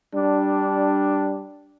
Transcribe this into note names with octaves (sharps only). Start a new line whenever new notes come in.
G3 D4